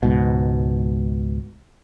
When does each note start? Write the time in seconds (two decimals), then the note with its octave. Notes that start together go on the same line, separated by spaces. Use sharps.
0.03 C#2 G#2 B2